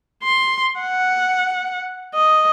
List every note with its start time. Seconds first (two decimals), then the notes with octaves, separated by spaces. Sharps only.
0.23 C6
0.80 F#5
2.14 D#5